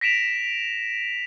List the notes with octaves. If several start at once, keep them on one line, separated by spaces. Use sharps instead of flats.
A#6 B6 D7 E7 F7